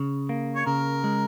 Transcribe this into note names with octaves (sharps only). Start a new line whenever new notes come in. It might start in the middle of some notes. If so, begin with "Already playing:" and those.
Already playing: C#3
A#3
C#5
C#3 A#4
G#3